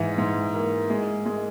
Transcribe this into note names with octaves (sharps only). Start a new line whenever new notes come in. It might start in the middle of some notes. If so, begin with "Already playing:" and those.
Already playing: G#2 E3
G#2
A#3
G#3
G#3